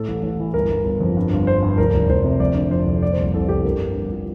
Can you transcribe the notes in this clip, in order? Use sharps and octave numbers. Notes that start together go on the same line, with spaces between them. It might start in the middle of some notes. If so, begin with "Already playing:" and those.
Already playing: A2 A4
A1
A1
E3
G1 A#4
G1
G1
F2
G2
G1
G1 C5
G2
F1 A#4
F1
F1 C5
C3
F1 D5
D3
F2 C5
F1
A#2 D5
C5
C2
C2 A4
C2 G4
G2 A#4
G2
G1
F3